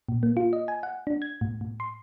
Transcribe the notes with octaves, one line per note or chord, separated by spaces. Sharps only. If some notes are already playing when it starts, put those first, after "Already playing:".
A#2
A#3
F4
D#5
G#5
F#5
D4
G#6
A2
A2
C6